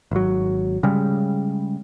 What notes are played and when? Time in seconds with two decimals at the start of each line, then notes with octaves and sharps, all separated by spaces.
0.11 G#1 F#3
0.83 C#3 G3 G#3